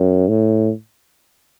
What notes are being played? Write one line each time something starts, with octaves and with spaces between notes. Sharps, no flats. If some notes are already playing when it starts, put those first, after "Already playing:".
Already playing: F#2
A2